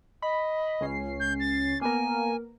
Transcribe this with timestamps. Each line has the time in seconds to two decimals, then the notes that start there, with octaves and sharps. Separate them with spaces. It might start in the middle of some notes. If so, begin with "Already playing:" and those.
0.22 D#5 B5
0.81 C#2 C#4 C7
1.20 G6
1.40 A6
1.81 A#3 B3 A#4 G#5